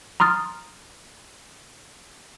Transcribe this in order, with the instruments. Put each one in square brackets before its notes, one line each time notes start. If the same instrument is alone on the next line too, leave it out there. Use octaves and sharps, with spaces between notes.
[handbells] A#5 C6 D#6 F6 A6